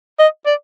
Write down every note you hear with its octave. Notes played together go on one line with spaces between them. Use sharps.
D#5
D5